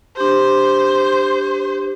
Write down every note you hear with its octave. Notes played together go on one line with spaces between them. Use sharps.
D4 G4 C5